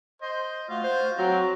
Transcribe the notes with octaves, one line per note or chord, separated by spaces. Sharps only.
C5 D#5
A3 F4 F#4
C5
F#3 C4 F#4 A#5